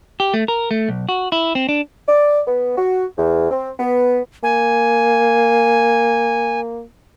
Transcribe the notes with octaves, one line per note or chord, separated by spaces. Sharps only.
G4
A3
A#4
A3
B1
F#4
E4
C4
D4
D5
B3
F#4
E2
C4
B3
A#3 G#5